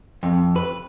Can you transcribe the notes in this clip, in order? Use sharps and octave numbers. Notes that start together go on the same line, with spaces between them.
F2
B4